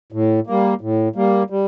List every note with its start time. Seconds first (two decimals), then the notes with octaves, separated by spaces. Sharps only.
0.12 A2
0.47 G3 A#3
0.81 A2
1.16 G3 A#3
1.50 G3